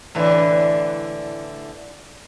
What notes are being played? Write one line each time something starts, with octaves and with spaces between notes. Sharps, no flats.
A2 D3 E3